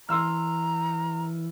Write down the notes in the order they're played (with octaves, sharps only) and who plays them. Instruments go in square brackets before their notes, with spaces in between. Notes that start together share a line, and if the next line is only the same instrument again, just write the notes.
[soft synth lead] E3 [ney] A#5 [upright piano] C6 E6 F6